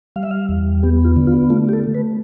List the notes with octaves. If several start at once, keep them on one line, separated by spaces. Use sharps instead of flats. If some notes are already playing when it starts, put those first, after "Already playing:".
G3 F5
E5
F5
E2
B3 G4
F4
D3
F4
A3 F4
G4
A4
A3
B4